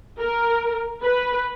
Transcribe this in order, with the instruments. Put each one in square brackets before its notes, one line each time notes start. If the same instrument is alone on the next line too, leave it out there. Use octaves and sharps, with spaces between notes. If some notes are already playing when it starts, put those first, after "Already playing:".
[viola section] A#4
B4